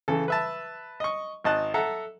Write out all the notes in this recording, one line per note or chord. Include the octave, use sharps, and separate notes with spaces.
C#3 E3 A4
B4 E5 A5
D#5 C#6
G#1 D#5 A5 F#6
A4 E5 F#5 A#5